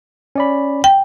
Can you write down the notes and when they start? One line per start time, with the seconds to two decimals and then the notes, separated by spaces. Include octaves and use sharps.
0.36 C#4 D5 B5
0.84 G5